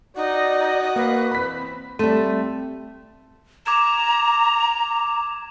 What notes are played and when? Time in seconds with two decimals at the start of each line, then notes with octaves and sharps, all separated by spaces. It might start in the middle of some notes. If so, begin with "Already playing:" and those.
0.16 D#4 F#4 D5 D#5
0.96 A#3 B4
1.32 E3 C4 B5 B6
1.99 G3 A3 C4
3.66 A#5 D6 G#6 E7